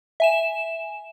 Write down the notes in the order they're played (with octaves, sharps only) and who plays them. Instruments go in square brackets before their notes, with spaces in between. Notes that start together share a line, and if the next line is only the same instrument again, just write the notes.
[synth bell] E5 G#5 E7